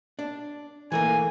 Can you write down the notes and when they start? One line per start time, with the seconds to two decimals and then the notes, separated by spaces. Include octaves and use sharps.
0.19 D4
0.92 E3 A3 A#3 G#5